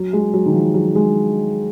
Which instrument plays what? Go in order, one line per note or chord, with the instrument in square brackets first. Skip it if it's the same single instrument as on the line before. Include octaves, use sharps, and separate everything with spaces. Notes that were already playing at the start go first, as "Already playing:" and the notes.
Already playing: [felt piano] F#3
G#3
F#3
D#3
F3
F#3
G#3